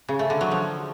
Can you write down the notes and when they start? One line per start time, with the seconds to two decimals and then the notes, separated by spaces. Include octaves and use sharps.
0.08 C#3
0.19 A3
0.30 D3
0.41 F#3
0.51 F3